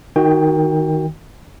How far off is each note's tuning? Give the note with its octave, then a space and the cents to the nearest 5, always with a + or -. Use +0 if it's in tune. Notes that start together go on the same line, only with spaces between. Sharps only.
D#3 +0 F#4 +15 G5 +25